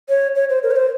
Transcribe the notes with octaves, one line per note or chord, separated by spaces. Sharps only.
C#5
C#5
C5
A#4
C#5
C5